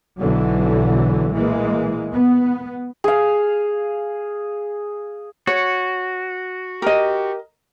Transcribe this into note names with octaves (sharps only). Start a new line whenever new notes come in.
B1 B2 D3 E3 F#3
A#2 E3 G#3 A#3
B3
G#4 F5
F#4 C#5
G4 A#4 D#5